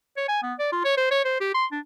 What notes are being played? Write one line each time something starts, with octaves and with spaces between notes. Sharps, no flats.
C#5
G#5
B3
D5
F4
C#5
C5
C#5
C5
G4
C6
D4